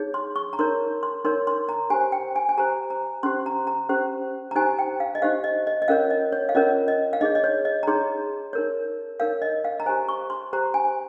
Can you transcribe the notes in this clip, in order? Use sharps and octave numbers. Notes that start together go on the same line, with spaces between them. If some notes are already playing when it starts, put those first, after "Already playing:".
Already playing: D#4 G#4 C#5
C6
C#6
A#5
D#4 A#4 C#5 C6
C6
D#4 A#4 C#5 C6
C6
A#5
G4 C5 G#5
G5
G#5
G#5
G4 C5 A#5
A#5
C#4 G4 C5 C6
A#5
A#5
C#4 G4 C5
A#5
D#4 G4 C5 G#5
G5
F5
D#5
D#4 G4 C5 F5
D#5
D#5
D#5
C#4 F4 A#4 C#5 F5
D#5
C#5
F5
C#4 F4 A#4 C#5 D#5
D#5
F5
D#4 G#4 C#5 D#5
D#5
C#5
D#5
A#5
D#4 G#4 C#5 C6
D#4 A#4 C#5
D#4 A#4 C#5 F5
D#5
F5
A#5
G4 C5 G#5
C#6
C6
G4 C5 A#5
G#5